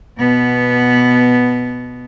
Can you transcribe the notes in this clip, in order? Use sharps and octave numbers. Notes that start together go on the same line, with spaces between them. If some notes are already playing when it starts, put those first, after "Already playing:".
B2 B3